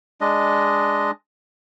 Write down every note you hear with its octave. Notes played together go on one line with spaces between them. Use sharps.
G#3 D4 D#5